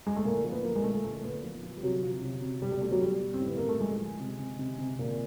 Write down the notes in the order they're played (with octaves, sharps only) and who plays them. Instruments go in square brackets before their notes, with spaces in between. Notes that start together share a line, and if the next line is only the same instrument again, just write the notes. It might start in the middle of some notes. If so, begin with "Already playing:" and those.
[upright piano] G#3
A3
A#2 A#3
F3 A#3
B3
F3 A#3
G#3
A#2 A3
A#2 A3
A#2 B3
F3
F3
G3
C3 F#3
F3
C3
C3
B2 G3
G3
B2 A3
F#3
B2 G3
B2
C4
A2
B3
A2 A#3
A3
F3 G#3
F3
C3
C3
C3
C3
A#2